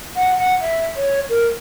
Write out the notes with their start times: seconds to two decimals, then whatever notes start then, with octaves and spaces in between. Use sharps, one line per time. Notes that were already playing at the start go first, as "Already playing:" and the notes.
0.16 F#5
0.38 F#5
0.61 E5
0.96 C#5
1.29 A#4